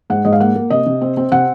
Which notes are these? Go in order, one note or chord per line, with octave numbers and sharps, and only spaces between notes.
G#2 F#5
G#2 D#5
F5
A#3 F#5
A#3
C3 D#5
C3
C4
C4
C3 F#5